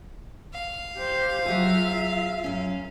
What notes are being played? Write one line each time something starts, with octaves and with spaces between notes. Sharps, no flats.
F5
G4 C5
F#3 F4 F#4 G#4 E5
F#2 C#4